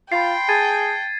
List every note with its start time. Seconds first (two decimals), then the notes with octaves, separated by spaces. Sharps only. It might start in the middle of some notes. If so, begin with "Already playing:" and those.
0.12 F4 G5 B5 C6 A6 C7
0.49 G#4 A5 G#6 A6 D#7